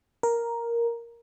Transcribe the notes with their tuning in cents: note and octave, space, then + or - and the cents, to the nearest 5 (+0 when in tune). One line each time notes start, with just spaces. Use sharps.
A#4 +5